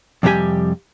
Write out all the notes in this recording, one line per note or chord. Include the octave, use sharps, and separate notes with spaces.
F2 C3 G3 A3 G4 G#5